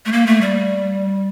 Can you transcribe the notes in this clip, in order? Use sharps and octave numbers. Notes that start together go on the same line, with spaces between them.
A3
A#3
A3
G3